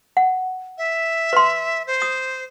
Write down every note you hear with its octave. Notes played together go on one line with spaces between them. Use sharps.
F#5
E5
B4 C6
C5
D#6